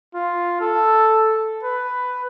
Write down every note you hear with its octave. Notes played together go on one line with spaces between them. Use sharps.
F4
A4
B4